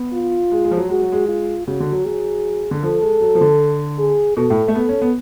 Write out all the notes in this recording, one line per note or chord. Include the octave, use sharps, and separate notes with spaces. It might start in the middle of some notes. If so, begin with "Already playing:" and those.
Already playing: B3
F4
G#3
G#3
F3
F#3
G#3 F#4
F#3
G#3
F4
C#3 F#4
D3
F#3
F#3 G#4
D3
F3 A4
G#3
F#3
F3
D3
G#4
B2 A4
A2
A3
B3 A4
C#4
B3